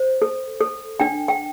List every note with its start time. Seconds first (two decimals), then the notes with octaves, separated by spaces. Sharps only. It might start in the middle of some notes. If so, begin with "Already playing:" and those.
Already playing: C5
0.22 A4
0.60 A4
1.00 D4 G5
1.28 G5